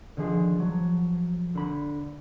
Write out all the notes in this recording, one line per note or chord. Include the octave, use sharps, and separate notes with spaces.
D3 D#3 F3 G#4
F3 F#3
D3 B5